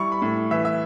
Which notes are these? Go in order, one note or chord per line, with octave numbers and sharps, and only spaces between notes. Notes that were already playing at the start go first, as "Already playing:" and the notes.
Already playing: G3 E4 C#6
B5
A2
E3 E5
E5